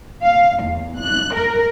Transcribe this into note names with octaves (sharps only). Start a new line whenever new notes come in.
F5
E2
F#6
A#4